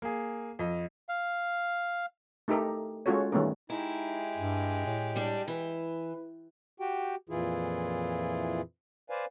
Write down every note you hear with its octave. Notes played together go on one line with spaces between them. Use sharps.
A#3 G#4
F2 D#5
F5
A3 D#4 G4 A4 A#4
G#3 C#4 F4 F#4 A4 C#5
D#3 G3 A3 B3 C#4 A#4
G#3 D#4 E4 G4
G2
A2
G3 D4
E3 B4
F#4 G4 G5
F2 A#2 E3 E4 F4 G#4
B4 C5 D5 F5 G#5